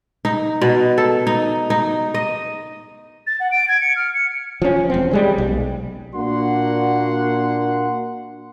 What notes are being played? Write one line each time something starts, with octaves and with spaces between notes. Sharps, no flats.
D#4
B2
A4
D#4
D#4
D#5
A6
F#5
D7
G#6
C#7
F6
C#7
F3 C#4
E1 C4
G3 G#3 C#4
B1
A#2 A#3 D4 F#4 F#5 C6